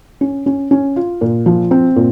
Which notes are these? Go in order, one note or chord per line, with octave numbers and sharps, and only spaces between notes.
C#4
C#4
C#4
F4
A#2
F3
C4
A#2